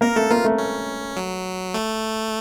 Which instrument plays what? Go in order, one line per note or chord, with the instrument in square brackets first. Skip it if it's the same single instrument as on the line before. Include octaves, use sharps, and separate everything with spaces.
[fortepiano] A#3 [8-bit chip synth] A#4
[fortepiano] A3 [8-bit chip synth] A4
[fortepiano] A#3 [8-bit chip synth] F4
[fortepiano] A3
[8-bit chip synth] C#4
F#3
A3